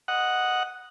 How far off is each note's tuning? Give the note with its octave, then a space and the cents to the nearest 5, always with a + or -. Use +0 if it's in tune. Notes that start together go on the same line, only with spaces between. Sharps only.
D#5 +0 F#5 +0